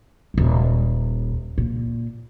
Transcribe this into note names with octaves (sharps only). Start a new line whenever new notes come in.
D#1 G#1
A#2